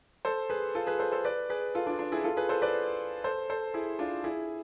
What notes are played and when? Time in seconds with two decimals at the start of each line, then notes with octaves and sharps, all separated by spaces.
0.25 A4 C5
0.50 G#4 B4
0.75 F4 A4
0.87 G#4 B4
0.99 A4 C5
1.12 A4 C5
1.25 B4 D5
1.50 G#4 B4
1.75 F4 A4
1.87 D4 F4
1.99 D4 F4
2.12 E4 G#4
2.24 F4 A4
2.37 G#4 B4
2.49 A4 C5
2.62 B4 D5
3.24 A4 C5
3.50 A4 C5
3.74 E4 G#4
3.99 D4 F4
4.24 E4 G#4